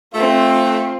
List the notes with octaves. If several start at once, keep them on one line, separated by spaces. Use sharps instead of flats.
A3 C4 F4